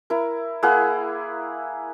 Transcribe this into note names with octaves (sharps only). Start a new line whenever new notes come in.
E4 A#4
A#3 E4 G#4 F#5